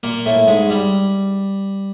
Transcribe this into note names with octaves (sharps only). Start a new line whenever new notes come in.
A#2 A#3
A2 A3
G#2 G#3
G3